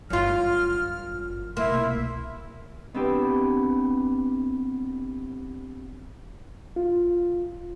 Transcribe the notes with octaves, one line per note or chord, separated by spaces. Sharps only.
G1 F#2 F4 F6
C2 B2 A#3 E4 E5 C6
B3 C4 D4 E4 G4
F4